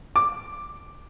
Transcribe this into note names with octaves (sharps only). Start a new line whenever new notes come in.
D6